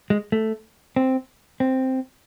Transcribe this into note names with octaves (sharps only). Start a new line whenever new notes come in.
G#3
A3
C4
C4